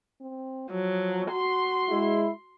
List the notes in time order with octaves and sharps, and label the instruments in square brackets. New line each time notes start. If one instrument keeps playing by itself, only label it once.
[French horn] C4
[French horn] F3 [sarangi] F#3
[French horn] F#4 [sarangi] C6
[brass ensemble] G#3 E4